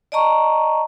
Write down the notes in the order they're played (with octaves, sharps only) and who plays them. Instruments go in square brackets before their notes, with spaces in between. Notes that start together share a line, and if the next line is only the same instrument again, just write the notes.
[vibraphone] D5 D#5 A5 A#5 C#6